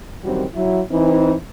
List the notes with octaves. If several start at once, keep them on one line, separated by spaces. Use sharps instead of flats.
F#2 D#3 E3 G3 C4 F#4
F#3 E4
E3 C4 D#4